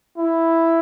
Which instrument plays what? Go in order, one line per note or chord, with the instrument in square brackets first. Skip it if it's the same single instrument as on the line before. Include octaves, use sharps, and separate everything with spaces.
[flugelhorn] E4